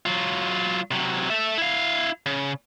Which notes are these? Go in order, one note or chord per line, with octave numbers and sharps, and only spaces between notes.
F#3 F4
C3 F#3
A4 E5
E4 F5
C#3